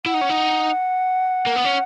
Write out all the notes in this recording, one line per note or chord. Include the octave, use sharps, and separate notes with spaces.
E4 F#5
D#4
C#4
D#4
A#3
B3
C#4